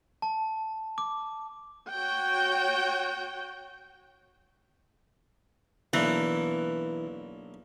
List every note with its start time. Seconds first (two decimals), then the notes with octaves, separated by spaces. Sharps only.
0.22 A5
0.98 D6
1.93 F#4 C#5 G5
5.93 B1 E3 A#3 D4